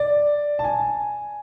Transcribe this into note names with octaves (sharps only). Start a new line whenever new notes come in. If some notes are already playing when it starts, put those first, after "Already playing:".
Already playing: D5
A5
G#5